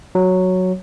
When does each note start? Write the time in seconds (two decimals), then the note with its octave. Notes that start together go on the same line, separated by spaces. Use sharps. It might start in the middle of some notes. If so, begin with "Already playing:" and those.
0.15 F#3